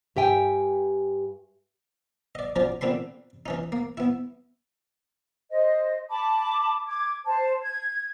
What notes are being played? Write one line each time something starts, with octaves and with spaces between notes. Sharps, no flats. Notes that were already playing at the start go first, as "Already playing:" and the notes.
G2 G4 E5 G5 G#5
D5 D#5
F3 F#3 C#4 C5 D5
A#2 D3 C4 B5 C6
E3 C#4 D#4
A#3
B3 E4
C5 D#5
A5 B5 D6
D6 G#6
C5 A5
G#6